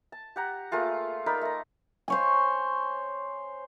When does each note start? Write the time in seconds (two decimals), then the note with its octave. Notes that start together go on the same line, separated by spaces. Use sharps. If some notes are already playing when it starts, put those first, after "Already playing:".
0.12 A5
0.36 G4 F#5 A#5
0.71 A3 A#3 F4 G#4
1.26 D#4 A#4 D5 B5
1.41 A3 A#5
2.08 C5 C#5 G#5